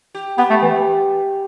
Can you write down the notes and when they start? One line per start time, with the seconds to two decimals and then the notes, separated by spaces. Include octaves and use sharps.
0.15 G4
0.38 B3 G4
0.50 A3
0.62 E3